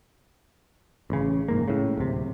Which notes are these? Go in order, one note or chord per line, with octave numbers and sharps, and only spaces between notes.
A1 C#3
F1 G#2 A#3
A2 C#3
D1 C3